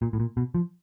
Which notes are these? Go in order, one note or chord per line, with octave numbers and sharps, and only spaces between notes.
A#2
A2
A#2
B2
F3